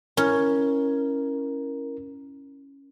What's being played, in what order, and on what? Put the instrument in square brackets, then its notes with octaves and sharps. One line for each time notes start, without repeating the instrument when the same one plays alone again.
[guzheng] C#4 [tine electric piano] E4 A#4